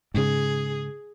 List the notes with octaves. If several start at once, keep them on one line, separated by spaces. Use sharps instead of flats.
G#2 C#3 G#4